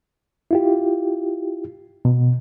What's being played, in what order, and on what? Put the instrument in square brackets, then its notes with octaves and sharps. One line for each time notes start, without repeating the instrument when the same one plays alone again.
[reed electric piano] E4 F4 G4
B2